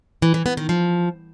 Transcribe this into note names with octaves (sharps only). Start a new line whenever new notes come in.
E3
E3
B3
D#3
F3